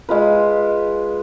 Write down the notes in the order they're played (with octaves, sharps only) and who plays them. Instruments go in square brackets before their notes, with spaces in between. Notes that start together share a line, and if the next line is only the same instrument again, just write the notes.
[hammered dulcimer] G#3 F4 B4